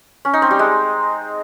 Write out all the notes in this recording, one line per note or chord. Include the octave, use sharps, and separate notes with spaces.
C#4
D#4
C4
G3
G#3